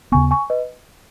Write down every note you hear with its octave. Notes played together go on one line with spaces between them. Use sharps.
D#2 C#3 B3 G#5 C#6
G#5 C#6
B4 D#5